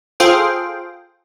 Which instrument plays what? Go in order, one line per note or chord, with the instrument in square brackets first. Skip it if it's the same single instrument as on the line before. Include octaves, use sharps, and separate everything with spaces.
[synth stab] F4 G#4 A4 C5 F5 G5